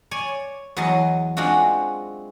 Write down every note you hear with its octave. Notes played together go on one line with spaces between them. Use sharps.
C#5 D5 G#5
E2 F#3 D#5 A5 C6
G#3 C4 D4 F4 F#4